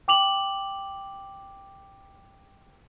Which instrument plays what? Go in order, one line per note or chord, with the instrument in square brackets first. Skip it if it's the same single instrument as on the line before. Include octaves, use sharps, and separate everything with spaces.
[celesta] G5 D6 F7 F#7